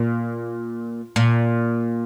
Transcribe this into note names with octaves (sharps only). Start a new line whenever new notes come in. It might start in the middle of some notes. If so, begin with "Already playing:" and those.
Already playing: A#2
A#2